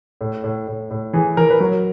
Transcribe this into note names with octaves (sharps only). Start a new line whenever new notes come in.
A2
A2
A2
A2
E3 G#4
E3 A#4
B4
F#3 A#4